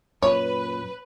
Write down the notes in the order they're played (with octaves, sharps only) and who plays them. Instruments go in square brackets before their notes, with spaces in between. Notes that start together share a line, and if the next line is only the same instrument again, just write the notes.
[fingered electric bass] F#2 A#2 [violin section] B4 [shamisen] C#5